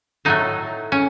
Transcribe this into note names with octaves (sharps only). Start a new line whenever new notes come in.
A2 F#3 A3 D#4
C#4